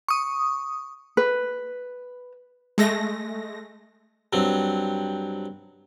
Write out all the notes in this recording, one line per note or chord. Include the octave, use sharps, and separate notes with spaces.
C#6 D#6
B4
G#3 A3 A#6
G2 F#3 C4